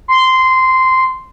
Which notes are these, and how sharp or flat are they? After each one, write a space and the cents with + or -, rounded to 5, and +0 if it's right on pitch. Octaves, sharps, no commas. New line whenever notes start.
C6 -10